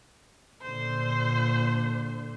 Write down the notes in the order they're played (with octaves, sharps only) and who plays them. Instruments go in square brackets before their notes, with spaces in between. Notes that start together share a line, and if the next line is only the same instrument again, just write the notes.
[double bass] A#2 D3 [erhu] C5